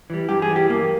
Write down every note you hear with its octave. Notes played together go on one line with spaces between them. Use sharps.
E3 G3
G2 G4
G#4
E3 G3
G4
G2 A#3